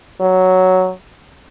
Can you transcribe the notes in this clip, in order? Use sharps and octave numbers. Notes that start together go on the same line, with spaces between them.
F#3